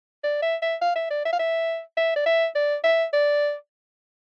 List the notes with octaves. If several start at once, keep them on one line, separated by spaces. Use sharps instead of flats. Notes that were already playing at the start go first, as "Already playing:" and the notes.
D5
E5
E5
F5
E5
D5
E5
F5
E5
E5
D5
E5
D5
E5
D5